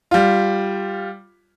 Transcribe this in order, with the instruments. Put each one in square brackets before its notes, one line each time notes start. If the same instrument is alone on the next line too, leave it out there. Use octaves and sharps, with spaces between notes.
[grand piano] G3 F4